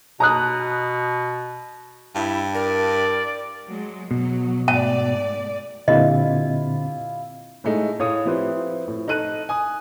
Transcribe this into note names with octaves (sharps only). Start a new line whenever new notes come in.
B2 A#5 D#6 F#6
G2 E4
A#4 D5
F#3 G#3
B2 F#3
G#2 A3 D5 A5
A#2 D3 C4 E4 F4 G4 D#5
A2 G#3 A3 D#4
A2 C#5 F5 D#6
F3 C4 E4 G4 B4 C5
A2
D#4 A4 F#6 D#7
G#5 D#6